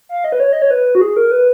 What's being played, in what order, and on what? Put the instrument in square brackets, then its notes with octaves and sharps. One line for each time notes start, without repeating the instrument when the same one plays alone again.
[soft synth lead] F5
D#5
B4
C#5
D#5
C#5
B4
F#4
G#4
A#4
B4